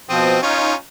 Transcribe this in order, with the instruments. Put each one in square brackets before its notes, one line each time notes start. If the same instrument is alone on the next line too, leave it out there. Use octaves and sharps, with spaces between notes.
[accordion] B2 F3 D#6 [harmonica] C4
[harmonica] C#4 F4 [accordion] D#4